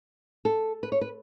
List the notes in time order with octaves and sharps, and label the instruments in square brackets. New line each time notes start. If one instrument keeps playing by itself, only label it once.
[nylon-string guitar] A4
B4
C#5
B4